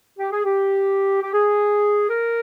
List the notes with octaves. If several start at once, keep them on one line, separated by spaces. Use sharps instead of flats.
G4
G#4
G4
G4
G#4
A#4